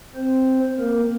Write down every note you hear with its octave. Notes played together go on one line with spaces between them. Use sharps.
C4 C5
A#3 A#4